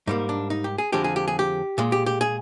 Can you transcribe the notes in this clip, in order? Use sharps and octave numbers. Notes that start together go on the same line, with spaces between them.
G#2 G3 A#3 D#4
D4
D#4
G4
G#4
F2 D3 F3 G#3 G4
G#4
G4
G#4
G4
A#2 G#3
G4
G4
G#4